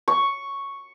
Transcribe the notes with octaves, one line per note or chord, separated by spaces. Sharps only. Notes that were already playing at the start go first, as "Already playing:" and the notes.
C#6